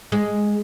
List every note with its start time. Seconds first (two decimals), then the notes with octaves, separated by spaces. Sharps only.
0.12 G#3